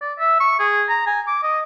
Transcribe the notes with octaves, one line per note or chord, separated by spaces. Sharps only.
D5
E5
C#6
G#4
A#5
G#5
D6
D#5